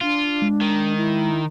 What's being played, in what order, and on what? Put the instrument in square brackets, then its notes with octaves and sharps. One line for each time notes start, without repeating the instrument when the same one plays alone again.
[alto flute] D4 [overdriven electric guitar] F4
[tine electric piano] G#3
[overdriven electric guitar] D#3
[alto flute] E4